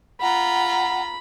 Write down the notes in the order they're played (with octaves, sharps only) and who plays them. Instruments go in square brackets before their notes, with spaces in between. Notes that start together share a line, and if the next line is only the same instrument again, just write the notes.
[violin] F4 A#5 [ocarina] F#5 [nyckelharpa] B5